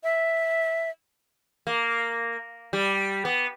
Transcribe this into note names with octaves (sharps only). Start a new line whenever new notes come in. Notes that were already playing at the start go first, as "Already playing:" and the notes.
E5
A#3
G3
B3